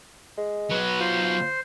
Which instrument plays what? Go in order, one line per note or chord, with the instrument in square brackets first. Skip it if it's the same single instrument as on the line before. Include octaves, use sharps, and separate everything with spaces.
[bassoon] G#3
[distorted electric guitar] F#3 B3 [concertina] B4
[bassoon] F4 [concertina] C5